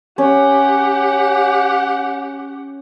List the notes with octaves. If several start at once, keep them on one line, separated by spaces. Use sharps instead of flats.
C#4 G4 F#5